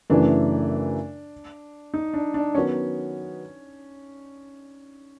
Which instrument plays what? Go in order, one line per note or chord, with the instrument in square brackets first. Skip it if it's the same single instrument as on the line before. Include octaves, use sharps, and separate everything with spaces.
[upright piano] F#2 C#3 E3 A3 [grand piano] D4
[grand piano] D#4
D4
D4
[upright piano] D#3 F#3 B3 [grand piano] C#4